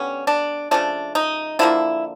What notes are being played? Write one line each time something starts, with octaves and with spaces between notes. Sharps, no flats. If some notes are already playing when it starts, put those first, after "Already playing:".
Already playing: D3 G3 B3 C#4
D4
C#3 F3 A3 D4
D#4
D3 F3 A#3 E4